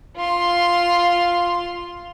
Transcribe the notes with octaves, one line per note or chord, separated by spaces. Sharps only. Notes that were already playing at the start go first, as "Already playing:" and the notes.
F4 C6